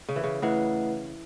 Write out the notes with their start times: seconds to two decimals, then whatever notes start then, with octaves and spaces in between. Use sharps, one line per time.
0.09 C#3
0.16 E3
0.24 C#3
0.42 E3 A3 E4 B4 F#5